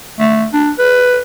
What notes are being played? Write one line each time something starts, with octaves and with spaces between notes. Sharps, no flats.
A3
D4
B4